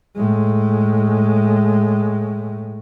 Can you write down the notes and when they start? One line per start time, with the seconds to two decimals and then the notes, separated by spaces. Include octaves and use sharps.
0.15 A2 G#3